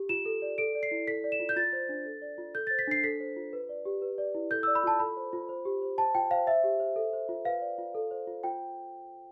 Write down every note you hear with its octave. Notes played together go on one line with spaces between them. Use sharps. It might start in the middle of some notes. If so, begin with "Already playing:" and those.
Already playing: G4
F4 E7
A4
D5
A4 D7
D5
C7
E4
A4 B6
D5
E7
F4
G6
F4 A6
C5
D4
A4
D5
F4
A4 G6
A6
C5
B6
D4 C7
A4 B6
C5
F4
B4
D5
G4
B4
D5
E4
A4 G6
E6
D5
B5
F4 A5
A4 B5
C5
F4
C5
G4
C5
C5 A5
F4 G5
C5 F5
C5 E5
G4
C5
A4
C5
F4
B4 F5
D5
F4
A4
C5
F4
F4 G5